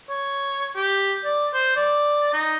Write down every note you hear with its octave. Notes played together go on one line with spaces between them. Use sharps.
C#5
G4
D5
C5
D5
D#4